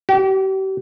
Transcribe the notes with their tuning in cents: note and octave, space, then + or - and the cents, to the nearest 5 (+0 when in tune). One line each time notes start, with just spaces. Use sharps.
G4 -40